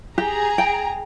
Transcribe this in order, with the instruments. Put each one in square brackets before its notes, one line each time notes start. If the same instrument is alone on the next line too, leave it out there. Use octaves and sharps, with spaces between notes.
[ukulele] G4 [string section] G#4 A#5
[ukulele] G5